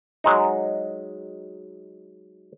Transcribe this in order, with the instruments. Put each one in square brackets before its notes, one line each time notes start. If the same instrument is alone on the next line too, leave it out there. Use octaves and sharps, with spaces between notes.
[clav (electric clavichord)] F#3 G#3 D#4